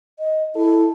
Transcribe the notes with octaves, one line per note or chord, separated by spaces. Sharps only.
D#5
E4 A4